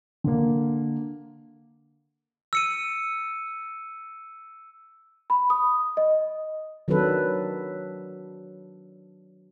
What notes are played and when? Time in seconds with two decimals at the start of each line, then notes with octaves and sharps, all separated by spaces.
0.24 D3 A#3
2.53 E6 C#7 D#7
5.30 B5
5.50 D#6
5.97 D#5
6.88 D#3 F#3 C4 D4 A4 B4